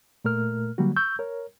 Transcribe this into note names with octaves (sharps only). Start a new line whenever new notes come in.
A#2 A3 A#4 F6
D3 F#3 G3 A#3 F#4
C#6 E6 G6
A#4 C#5